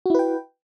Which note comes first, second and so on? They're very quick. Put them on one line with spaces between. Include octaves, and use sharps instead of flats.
F#4 E4 B4 G5